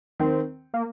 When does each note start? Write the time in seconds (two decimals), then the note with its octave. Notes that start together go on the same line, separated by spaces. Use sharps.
0.19 D#3 C4
0.74 A#3